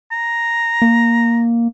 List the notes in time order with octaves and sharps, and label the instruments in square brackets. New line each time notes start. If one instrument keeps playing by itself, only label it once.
[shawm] A#5
[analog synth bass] A#3